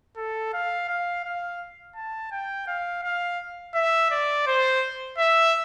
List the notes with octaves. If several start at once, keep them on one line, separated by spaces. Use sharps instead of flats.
A4
F5
F5
F5
A5
G5
F5
F5
E5
D5
C5
E5